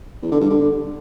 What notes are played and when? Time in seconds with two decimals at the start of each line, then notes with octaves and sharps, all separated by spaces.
0.22 E2
0.32 D3
0.41 G2
0.50 D3